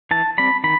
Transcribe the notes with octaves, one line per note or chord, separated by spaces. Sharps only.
E3 A5
G3 C4 B5
D#3 B5